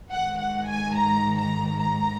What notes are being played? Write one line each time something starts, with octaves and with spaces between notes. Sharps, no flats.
G#2 D#3 F#5
F#5
G#5
A#5
A#5
A#5